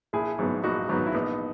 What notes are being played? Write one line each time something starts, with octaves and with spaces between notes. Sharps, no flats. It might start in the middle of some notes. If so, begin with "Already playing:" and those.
A#1 E4 G#4
G#2 F#3 B3
A#1 D#4 F#4
G#2 F#3 B3
E4
A#1 B3 D#4